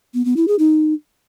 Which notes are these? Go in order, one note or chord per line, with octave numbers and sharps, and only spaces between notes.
B3
B3
E4
G#4
D#4